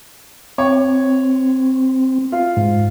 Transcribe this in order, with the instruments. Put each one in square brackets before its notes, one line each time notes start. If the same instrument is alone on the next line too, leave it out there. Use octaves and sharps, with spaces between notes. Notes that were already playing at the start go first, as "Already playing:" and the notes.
[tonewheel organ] C4 [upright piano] C#5
[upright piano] F4 F5
[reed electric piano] G#2